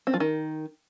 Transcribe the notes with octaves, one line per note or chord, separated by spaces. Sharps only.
C4
F3
D#3